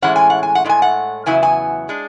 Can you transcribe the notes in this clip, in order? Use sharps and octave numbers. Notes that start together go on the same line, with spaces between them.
A2 E3 G#3 C#4 F#5
G#5
F#5
G#5
F#5
A2 G#3 D4 G#5
F#5
E2 C#3 F#3 B3 E4 G#5
G#5
G#3 D4